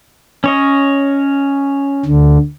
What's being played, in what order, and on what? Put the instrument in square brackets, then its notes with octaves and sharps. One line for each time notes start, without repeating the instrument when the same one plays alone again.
[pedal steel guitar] C#4 C#5 D#5
[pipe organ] D2 D3